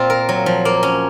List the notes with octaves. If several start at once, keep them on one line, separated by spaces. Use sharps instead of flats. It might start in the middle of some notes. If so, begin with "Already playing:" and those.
Already playing: A#2 C4 F4
A#4
F#3
F3
A#3
C#4